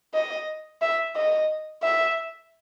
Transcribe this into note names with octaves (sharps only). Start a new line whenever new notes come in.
D#5
E5
D#5
E5